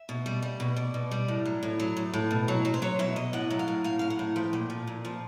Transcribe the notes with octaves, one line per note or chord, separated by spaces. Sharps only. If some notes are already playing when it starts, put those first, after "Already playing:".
Already playing: E5
B2
G3
G3
B2
B2 D5
B2
G3
A2
F#3
A2
F#3
A2
A2
B2
F#3
F#3
C5
F#3 C#5
B2 E5
B2 D#5
A2 F#5
F#3
F5
A2
A2 F5
F#3 F5
F#5
A2
F3 G5
A#2
F3
A#2
F3